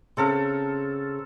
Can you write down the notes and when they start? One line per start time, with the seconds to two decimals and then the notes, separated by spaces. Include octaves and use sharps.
0.17 C#3 C4 A4 A#4